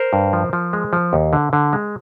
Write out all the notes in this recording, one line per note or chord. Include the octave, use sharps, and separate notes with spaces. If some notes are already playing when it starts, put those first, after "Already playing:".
Already playing: A#4 C5
G2
F3
F3
G#3
F3
D#2
D3
D3
G#3